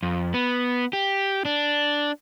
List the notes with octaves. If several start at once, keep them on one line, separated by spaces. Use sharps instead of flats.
F2
B3
G4
D4